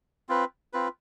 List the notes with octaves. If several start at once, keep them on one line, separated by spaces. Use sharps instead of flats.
C4 F4 B4
C4 F4 B4